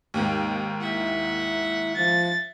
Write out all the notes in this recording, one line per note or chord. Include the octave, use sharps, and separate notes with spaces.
D#2 G#2
E4 E5 F#5
F3 A6